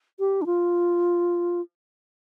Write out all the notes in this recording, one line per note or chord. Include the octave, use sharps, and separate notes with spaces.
G4
D4
F4